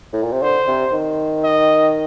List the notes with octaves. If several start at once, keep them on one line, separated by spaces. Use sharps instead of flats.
A2
A#2
C3
D3 C5
C3
D#3
D#5